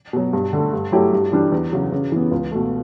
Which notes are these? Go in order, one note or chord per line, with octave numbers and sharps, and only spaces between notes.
B2 F#3
G2
D3 A3
G2
F#3 A3 E4 G4
G2
E3 G3 D4
E2
C#3 F#3
C#3
E3 B3
C#2
B2 A3